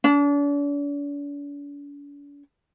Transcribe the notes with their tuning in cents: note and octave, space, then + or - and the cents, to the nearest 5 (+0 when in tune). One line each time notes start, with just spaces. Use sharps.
D4 -45